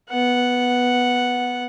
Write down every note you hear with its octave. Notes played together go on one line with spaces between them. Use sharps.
B3 F#5